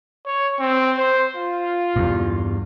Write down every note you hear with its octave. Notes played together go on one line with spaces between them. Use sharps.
C#5
C4
C5
F4
E2 G2